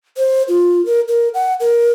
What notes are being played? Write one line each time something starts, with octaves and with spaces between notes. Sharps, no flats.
C5
F4
A#4
A#4
F#5
A#4